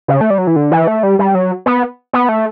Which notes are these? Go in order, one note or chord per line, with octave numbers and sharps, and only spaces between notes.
C#3
A3
G3
F#3
E3
D3
E3
A3
G3
G3
F#3
B3
B3
A3